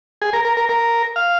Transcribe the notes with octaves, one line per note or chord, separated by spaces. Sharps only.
G#4
A#4
A#4
A#4
A#4
F5